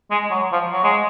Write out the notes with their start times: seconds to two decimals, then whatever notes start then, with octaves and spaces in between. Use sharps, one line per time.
0.11 G#3
0.31 F#3
0.52 F3
0.73 F#3
0.84 G#3